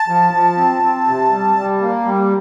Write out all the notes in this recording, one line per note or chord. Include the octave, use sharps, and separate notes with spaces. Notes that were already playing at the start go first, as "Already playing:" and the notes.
Already playing: A5
F3
F3
C4
C4
C3
G3
G3
A#3
G3